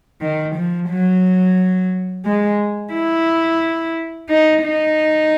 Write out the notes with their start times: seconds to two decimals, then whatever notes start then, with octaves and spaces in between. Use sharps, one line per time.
0.22 D#3
0.55 F3
0.89 F#3
2.25 G#3
2.93 E4
4.29 D#4
4.63 D#4